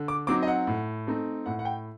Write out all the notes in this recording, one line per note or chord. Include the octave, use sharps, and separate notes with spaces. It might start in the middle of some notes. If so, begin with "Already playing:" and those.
Already playing: D3
D6
F#3 C4 D#4 D6
D#5
F#5
A2
A3 C4 D#4
A2 F#5
F#5
G5